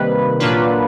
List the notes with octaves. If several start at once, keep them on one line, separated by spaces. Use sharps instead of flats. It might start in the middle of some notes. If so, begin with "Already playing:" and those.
Already playing: C3 D#3 G3 A#3 B4
A#2 F#3 A#3 D4 F4 B4